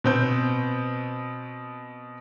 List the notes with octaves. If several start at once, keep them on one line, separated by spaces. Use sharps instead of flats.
B2 C4 G6